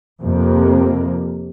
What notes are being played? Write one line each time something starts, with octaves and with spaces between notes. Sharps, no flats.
F2 C3 A#3